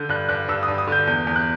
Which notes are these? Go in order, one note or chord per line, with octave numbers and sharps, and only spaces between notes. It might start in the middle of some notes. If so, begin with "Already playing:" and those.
Already playing: D3 G6
G2 F#6
G2 F#6
G2 E6
D#6
G2
D#6
D3 G6
E2 G6
E2
F#6